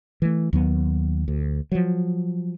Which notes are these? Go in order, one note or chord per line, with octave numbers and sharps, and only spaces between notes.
E3 A3
D#2 F#3 B3
D2
F3 F#3